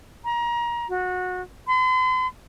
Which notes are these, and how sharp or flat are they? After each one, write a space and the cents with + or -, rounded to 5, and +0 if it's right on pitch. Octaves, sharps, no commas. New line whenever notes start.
A#5 +25
F#4 -20
C6 -45